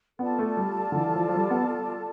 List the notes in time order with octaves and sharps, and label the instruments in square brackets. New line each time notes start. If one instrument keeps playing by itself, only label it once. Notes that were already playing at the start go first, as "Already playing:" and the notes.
[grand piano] B3 [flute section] F4 A4 D5 A5
[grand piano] A3
G3
D3
E3
F3
F3
G3
B3